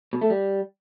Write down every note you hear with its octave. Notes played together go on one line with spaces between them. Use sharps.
B2
A3
G3